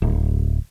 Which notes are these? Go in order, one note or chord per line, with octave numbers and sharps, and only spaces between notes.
D1